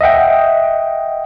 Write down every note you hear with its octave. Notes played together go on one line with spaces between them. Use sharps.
D#5 E5 F#5 G5